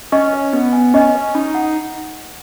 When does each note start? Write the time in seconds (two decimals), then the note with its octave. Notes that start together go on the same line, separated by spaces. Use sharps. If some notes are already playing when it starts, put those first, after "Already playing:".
0.12 C#4 D#5
0.33 B4
0.53 B3 B4
0.73 G#5
0.94 C#4 D#5
1.15 B4
1.35 D#4 B5
1.55 F#5